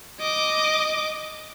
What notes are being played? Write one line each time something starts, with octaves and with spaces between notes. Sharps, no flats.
D#5 D6